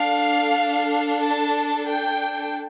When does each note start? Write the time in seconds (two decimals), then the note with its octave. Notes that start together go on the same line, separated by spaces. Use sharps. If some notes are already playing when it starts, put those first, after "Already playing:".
Already playing: D4 A4 F5
1.22 A5
1.88 G5